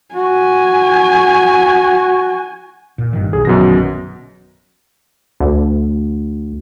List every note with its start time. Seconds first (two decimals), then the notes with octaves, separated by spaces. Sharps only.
0.14 F#4 G#5
2.98 A#2
3.13 F1 G2 D#3
3.33 B1 G#4
3.45 A#1 F#2 B2 D3 D#3 A#6
5.40 D2